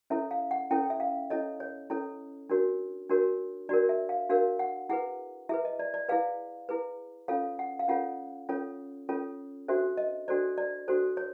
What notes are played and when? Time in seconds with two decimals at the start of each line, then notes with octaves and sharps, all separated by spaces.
0.10 C#4 E4 A4 C#5 E5
0.31 F5
0.51 F#5
0.71 C#4 E4 A4 C#5 G5
0.90 E5
1.00 F5
1.30 C#4 E4 A4 C#5 D#5
1.60 C#5
1.90 C#4 E4 A4 C#5
2.50 D4 F#4 A#4 C#5
3.09 D4 F#4 A#4 C#5
3.69 D4 F#4 A#4 C#5 D5
3.89 E5
4.09 F5
4.29 D4 F#4 A#4 C#5 F5
4.59 F#5
4.89 E4 G#4 B4 F#5
5.49 E4 G#4 B4 E5
5.65 D#5
5.79 D5
5.94 D5
6.09 E4 G#4 B4 F5
6.69 E4 G#4 B4
7.28 C#4 F4 A4 C#5 F5
7.59 F#5
7.79 F5
7.88 C#4 F4 A4 C#5 F#5
8.49 C#4 F4 A4 C#5
9.09 C#4 F4 A4 C#5
9.68 D4 F#4 A4 C5 E5
9.97 D#5
10.28 D4 F#4 A4 C5 D5
10.58 D5
10.88 D4 F#4 A4 C5
11.17 C#5